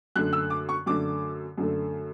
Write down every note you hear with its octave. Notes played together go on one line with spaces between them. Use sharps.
F#2 D3 A3 F#6
E6
D6
C#6
F#2 D3 A3 D6
F#2 D3 A3